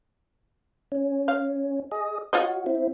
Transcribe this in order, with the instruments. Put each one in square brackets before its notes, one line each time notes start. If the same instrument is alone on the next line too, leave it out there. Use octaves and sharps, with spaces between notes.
[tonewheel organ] C#4
[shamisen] F5
[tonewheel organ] G#4 D#5
[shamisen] F4 C#5 D#5 [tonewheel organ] F#4
[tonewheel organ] C4 E4